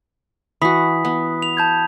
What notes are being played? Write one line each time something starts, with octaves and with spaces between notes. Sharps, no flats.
E3 F#4 B5 D#6 B6
B3
F7
A5 G6 G#6